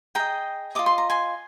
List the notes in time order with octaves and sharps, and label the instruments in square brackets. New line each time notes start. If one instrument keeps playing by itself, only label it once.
[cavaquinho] G#4 D#5 G5 A#5
F4 A#4 D#5 D6
C6
A#5
G#5 C6